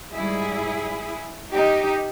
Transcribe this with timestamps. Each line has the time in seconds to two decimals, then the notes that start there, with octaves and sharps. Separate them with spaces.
0.15 G#2 G3 E4 G#4
1.54 D#4 G4